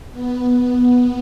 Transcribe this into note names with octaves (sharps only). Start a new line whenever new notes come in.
B3